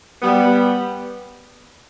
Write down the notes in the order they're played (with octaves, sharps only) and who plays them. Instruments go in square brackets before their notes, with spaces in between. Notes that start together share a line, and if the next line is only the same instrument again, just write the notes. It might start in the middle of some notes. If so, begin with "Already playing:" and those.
[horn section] G3 B3